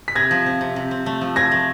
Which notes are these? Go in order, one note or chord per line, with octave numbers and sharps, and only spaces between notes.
B6
C3 G#6 A#6
F3
C4
C3
C3
C4
A3
F3
F3 G#6 A#6
A3